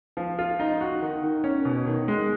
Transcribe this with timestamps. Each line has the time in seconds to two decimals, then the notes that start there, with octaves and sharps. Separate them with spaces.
0.17 F3
0.39 F4
0.60 D#4
0.81 F#4
1.02 D#3
1.23 D#3
1.44 C#4
1.65 B2
1.87 D#3
2.08 G#3